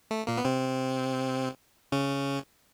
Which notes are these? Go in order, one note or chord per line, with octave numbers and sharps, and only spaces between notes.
A3
A#2 A#3
B3
C3 C4
C#3 C#4